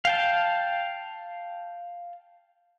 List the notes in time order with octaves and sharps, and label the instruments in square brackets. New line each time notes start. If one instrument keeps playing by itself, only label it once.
[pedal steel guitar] F5 G5 A5